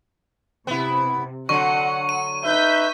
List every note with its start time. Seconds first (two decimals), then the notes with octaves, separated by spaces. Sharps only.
0.67 C3 B3 E4
1.49 D3 F#3 F#5 C#6
2.09 D#7
2.44 D#4 B4 E5 G6 B6